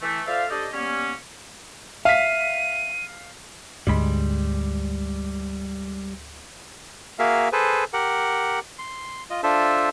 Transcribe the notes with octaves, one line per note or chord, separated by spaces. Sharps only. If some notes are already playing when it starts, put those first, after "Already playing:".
E3 A3
F4 A4 C5 D5 E5 F5
D4 G4 A4 C5 D5 D#5
G3 A#3 B3 C#4
E5 F5 B6 D#7
D2 G#2 G3 G#3 B5
A#3 F#4 G#4 A#4 E5 F5
G#4 A4 B4 C5
G4 A#4 F#5
C6
F4 D#5
D4 F4 A4 C5 E5